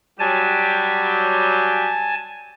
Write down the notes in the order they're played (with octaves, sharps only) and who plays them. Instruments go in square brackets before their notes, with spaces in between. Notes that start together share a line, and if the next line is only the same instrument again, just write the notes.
[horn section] F#3 G3 G4 [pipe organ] G#5 A5